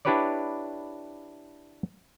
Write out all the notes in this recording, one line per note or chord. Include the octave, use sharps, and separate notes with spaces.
D4 E4 G4 B4 C#5 D5